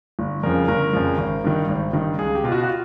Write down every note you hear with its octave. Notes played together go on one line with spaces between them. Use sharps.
G1
F2 C#3 F3 A#4
G1 A#4
F2 C#3 F3
G#1
G2 D#3
G#1
G2 D#3
C#2 G#4
G4
B2 F4
F#4
F#4
F4